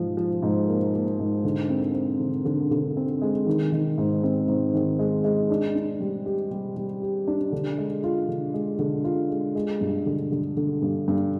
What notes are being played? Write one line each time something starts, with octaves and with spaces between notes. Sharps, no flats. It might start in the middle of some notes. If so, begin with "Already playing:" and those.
Already playing: G#2 F3
F3
G#2
A#3
A#3
G#2
D3
C4
C4
D3
D3
D3
C4
G#3
D#3
D#3
G#2
C4
G#2
D#3
G#3
G#3
D4
D4
G3
G4
G3
G3
G4
D4
D3
G#3
F4
D3
G#3
D3
F4
G#3
G#3
G2
D3
D3
D3
G2
G2